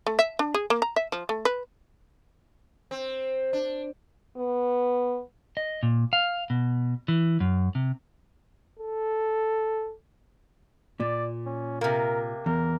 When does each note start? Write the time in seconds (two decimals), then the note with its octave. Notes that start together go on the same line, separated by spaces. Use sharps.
0.07 A3
0.19 E5
0.39 D4
0.54 G#4
0.70 A#3
0.82 A#5
0.96 E5
1.12 F3
1.29 A3
1.45 B4
2.91 C4
3.53 D4
4.37 B3
5.57 D#5
5.83 A#2
6.13 F5
6.50 B2
7.08 E3
7.40 F#2
7.75 C3
8.79 A4
11.00 A#2 D5
11.46 C#4
11.81 C3 A#3 A#4
12.46 E2 A#4